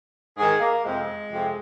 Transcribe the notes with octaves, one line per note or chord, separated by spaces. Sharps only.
G#2 D#3 G#4
A#3
F2 C3 F3 G#3
F2 C3 F3